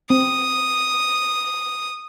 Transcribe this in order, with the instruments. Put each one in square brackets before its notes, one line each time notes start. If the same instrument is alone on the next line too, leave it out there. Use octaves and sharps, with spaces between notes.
[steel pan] C4 [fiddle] D#6